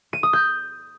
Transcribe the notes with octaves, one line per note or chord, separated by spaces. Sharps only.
D#7
D#6
G6